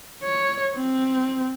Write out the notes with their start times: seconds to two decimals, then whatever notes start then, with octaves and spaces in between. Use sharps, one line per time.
0.23 C#5
0.75 C4